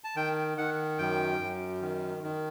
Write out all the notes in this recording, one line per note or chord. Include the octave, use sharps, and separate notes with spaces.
A5
D#3 G5
D#3 F#5
F#2 G5
F#2
D#3
D#3